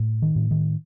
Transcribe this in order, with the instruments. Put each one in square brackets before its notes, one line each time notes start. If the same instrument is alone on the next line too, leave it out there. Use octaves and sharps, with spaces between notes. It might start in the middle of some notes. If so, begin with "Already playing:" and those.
Already playing: [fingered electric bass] A2
D#3
A2
D#3